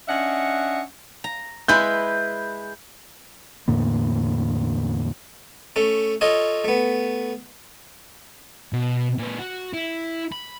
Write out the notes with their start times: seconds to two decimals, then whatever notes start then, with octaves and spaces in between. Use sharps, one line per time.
0.08 C#4 D4 D#5 E5 F#5
1.24 A#5
1.68 G#3 E4 B4 G6
3.68 E2 A2 D3 A#3
5.76 A3 C#4 A4
6.21 F4 A4 C#5 D#5
6.64 A3 B3
8.73 B2
9.18 A#2 B4
9.39 F#4
9.74 E4
10.32 B5